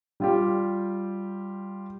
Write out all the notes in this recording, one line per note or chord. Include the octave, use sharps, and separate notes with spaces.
G3 F4 G4